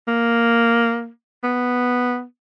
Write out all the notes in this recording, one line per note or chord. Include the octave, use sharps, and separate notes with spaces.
A#3
B3